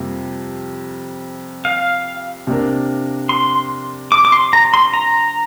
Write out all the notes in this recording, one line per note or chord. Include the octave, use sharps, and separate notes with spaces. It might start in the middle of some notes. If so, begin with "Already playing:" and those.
Already playing: F2 C3 G3 A#3
F5
C3 A#3 D4 A#4
C6
D6
D6
C6
A#5
C6
A#5